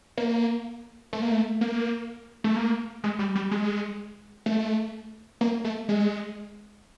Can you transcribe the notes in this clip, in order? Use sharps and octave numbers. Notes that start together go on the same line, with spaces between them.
A#3
A3
A#3
A3
A#3
A3
A#3
G#3
G3
G3
G#3
A3
A#3
A3
G#3